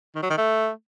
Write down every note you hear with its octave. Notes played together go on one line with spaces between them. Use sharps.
D#3
F#3
D#3
A3